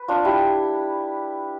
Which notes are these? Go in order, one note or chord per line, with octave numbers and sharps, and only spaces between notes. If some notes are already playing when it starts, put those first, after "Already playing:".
Already playing: B4
D4 F4
E4 G4